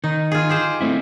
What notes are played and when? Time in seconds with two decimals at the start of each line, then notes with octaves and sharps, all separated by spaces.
0.04 D#3 D#4
0.32 F4 G#4
0.49 G4 G#4 C5
0.81 A3 C4 E4